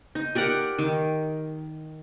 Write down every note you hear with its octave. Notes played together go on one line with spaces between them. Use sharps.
D#4
G4 A#4 D5 F#5
D#3